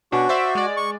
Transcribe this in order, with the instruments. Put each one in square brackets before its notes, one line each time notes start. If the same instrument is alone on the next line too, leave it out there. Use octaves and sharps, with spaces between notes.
[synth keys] B2 C#4 D4 [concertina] F#4
[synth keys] C5 D5 E5
G#3 D5
[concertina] C#6